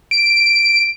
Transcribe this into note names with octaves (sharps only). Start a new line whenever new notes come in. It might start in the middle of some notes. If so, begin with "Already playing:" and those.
D7